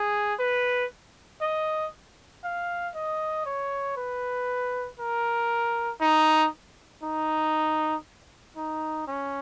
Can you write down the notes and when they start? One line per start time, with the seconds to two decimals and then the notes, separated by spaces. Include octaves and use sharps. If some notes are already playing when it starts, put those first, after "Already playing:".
Already playing: G#4
0.39 B4
1.42 D#5
2.44 F5
2.95 D#5
3.46 C#5
3.97 B4
5.00 A#4
6.01 D#4
7.03 D#4
8.57 D#4
9.08 C#4